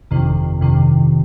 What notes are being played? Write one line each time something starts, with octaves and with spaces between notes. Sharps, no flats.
G1 F2 C3 D#3
G1 F2 C3 D#3